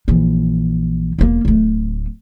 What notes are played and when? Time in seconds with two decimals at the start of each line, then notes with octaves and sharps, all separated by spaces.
0.08 A#1 E3
1.19 E1 A#3
1.45 D1 A3